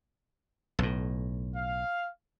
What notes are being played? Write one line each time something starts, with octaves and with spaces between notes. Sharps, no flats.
B1 A2
F5